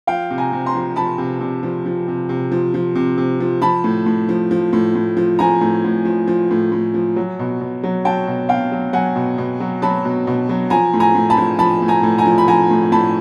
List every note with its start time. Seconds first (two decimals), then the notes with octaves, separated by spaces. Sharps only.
0.07 F3 F5 G5
0.30 C3
0.38 G#5 A#5
0.52 C3
0.66 A#5 C6
0.75 F3
0.96 F3 A5 B5
1.18 C3
1.41 C3
1.63 F3
1.86 F3
2.08 C3
2.29 C3
2.52 F3
2.74 F3
2.95 C3
3.18 C3
3.40 F3
3.62 F3 A5 B5
3.84 A2
4.06 A2
4.29 F3
4.51 F3
4.73 A2
4.95 A2
5.17 F3
5.39 F3 G#5 A#5
5.61 A2
5.84 A2
6.05 F3
6.28 F3
6.51 A2
6.72 A2
6.94 F3
7.16 F#3
7.39 B2
7.61 B2
7.84 F#3
8.05 F#3 G5 A5
8.27 B2
8.49 B2 F5 G5
8.72 F#3
8.93 F#3 F#5 G#5
9.16 B2
9.38 B2
9.60 F#3
9.82 F#3 A5 B5
10.05 B2
10.27 B2
10.49 F#3
10.70 F3 G#5 A#5
10.94 A2
11.00 G#5 A#5
11.15 A2
11.30 A5 B5
11.37 F3
11.59 F3 A5 B5
11.82 A2
11.88 G#5 A#5
12.03 A2
12.18 G#5 A#5
12.26 F3
12.38 B5
12.47 F3 G#5 A#5
12.71 A2
12.92 A2 A5 B5